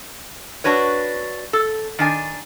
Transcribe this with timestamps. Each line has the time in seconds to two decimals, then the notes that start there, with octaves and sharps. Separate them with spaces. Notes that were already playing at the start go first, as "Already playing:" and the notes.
0.64 D4 F#4 B4 C#5
1.53 A4
1.99 D#3 D4 G#5